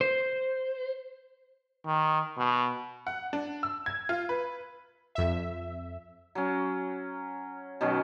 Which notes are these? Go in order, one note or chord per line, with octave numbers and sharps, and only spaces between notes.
C5
D#3
B2
F#5
D4
E6
G#6
F4
B4
F2 E5
F#3 C#4
B2 D#3 F#3 C#4